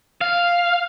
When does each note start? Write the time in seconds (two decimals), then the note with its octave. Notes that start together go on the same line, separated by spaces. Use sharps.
0.21 F5